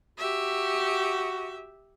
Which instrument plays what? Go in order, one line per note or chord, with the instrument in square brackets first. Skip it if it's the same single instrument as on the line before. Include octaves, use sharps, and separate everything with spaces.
[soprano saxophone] F#4 [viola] G4 E5